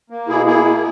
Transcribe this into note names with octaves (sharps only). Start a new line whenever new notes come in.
A#3
B2 E4 G#4
A#3 E4 G#4
A#3